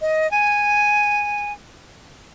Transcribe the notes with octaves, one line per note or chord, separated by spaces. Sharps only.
D#5
G#5